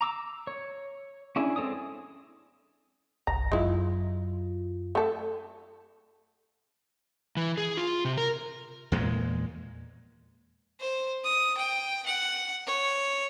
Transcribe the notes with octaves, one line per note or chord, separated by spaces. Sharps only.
A#5 D6 E6
C#5
C#4 D4 E4 G#4
G#3 C4 A4 C#5 D#6
G1 C2 A#5 A#6
F#2 F#3 G#3 E4 F4
A3 A4
E3
G#4
F4
C3
A#4
E2 A#2 G#3
C5
D#6
G5
F#5
C#5